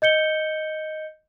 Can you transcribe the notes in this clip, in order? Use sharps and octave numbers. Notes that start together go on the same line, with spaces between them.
D#5 G6 C#7 G7